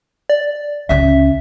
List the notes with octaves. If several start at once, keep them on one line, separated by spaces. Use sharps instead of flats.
D5
C#2 C#4 E5